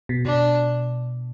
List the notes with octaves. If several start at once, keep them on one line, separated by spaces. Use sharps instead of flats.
B2
B2 D4